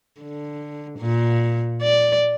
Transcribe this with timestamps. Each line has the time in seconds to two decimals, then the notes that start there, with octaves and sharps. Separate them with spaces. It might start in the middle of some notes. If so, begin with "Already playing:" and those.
0.21 D3
0.99 A#2
1.82 D5